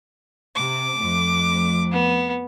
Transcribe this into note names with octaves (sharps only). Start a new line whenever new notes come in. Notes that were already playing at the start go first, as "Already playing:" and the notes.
C3 D6
F2 A3
B3